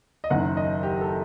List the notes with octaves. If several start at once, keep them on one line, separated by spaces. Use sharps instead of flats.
D#5
F#1 F#2 D#3 F#5
D#5
G4
A4